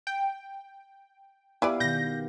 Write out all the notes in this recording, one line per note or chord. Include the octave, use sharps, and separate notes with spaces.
G5
B3 E4 G4 B4 D5 F5
B2 D#3 G6 A#6